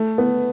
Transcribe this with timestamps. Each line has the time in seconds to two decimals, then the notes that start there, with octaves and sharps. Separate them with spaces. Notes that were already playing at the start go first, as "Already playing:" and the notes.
Already playing: A3
0.18 B3